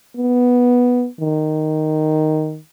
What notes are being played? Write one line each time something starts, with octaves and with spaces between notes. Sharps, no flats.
B3
D#3